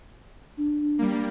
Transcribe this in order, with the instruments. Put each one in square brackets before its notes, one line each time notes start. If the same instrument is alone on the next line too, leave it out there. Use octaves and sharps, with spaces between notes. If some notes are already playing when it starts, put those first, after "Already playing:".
[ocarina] D4
[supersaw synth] G3 A#3